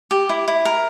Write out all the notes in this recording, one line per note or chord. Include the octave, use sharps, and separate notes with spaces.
G4
E4
E4
A#4